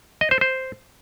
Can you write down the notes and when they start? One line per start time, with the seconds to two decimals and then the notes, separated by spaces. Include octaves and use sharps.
0.21 D#5
0.31 C5
0.41 C5